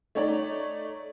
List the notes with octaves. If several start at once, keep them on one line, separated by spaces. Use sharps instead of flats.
A3 D#4 C#5 D5